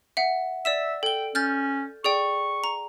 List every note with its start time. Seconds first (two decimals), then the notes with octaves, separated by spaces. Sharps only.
0.17 E5 F#5
0.65 D5 E5 E6 E7
1.03 A4 G5 G7
1.35 C#4 F6 G6 A6
2.04 G#4 D5 G5 C#6
2.64 A#5